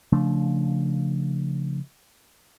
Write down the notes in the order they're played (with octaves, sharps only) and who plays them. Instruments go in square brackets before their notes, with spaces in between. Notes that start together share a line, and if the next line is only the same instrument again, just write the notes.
[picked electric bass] C#3 F3 A3 D4